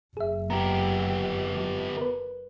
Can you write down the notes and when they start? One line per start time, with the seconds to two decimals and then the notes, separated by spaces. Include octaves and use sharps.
0.17 F#1 G#4 E5
0.50 B3 G4 A#5
1.55 F#3
1.97 A#4 B4